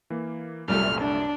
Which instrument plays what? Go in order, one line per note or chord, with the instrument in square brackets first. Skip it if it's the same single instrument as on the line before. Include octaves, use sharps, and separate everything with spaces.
[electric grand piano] E3 A#3
[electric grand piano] C2 F#2 [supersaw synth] A#2 G3 A3 [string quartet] F6
[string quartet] D4